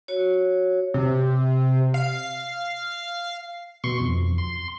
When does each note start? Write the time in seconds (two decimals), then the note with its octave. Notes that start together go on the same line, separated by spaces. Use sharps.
0.08 F#4 C#5
0.94 C3
1.94 F5
3.84 B2 C6 C#6
4.00 F2
4.38 C6